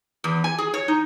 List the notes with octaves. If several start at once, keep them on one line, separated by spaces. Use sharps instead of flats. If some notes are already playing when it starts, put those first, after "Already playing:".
E2
G#5
G#4
C#5
D#4